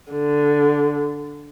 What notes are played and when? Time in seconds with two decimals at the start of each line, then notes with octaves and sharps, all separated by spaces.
0.12 D3